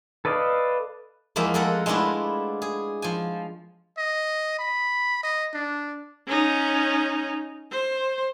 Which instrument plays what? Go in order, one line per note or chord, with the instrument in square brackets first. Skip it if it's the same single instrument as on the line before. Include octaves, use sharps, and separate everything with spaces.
[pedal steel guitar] A4 B4 D5 D#5 F5
[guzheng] E2 F3 G#3 A#3 E5
F2 G#3 A4 A#4 F#5
G#3 A3 B3 D4 E4 F4
G#4
F3 G#5
[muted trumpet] D#5
B5
D#5
D4
[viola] C#4 D#4
C5